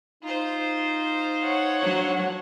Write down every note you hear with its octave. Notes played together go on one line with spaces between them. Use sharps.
D#4 F4 C5
C#5 F#5
F#3 D4